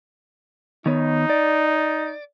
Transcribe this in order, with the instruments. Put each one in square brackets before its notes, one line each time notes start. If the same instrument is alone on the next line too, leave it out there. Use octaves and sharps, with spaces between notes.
[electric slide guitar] D#3 B3 C#5 [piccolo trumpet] D#4
[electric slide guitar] D5